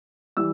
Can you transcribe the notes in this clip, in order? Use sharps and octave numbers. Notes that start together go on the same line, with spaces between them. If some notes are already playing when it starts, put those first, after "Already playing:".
E3 G3 E6